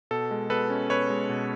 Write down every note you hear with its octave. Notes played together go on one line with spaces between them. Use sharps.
B2 A4
G#3
B2 A4 B4
C#4
B2 B4 C#5
G#3
B2